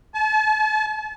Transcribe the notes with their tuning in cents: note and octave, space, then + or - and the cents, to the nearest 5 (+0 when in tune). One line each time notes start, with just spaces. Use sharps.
A5 -40